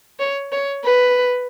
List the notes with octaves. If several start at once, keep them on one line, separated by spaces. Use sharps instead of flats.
C#5
C#5
B4